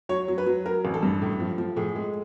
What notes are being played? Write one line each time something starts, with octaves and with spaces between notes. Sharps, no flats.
F#3 C#5
F#3
B4
F#3
F#3 A#4
A1
A4
G2
A2
F3
F3
A2 G#4
G#3